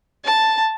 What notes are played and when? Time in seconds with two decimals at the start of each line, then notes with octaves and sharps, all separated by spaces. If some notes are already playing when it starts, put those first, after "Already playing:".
0.24 A5